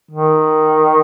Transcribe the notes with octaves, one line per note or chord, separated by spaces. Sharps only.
D#3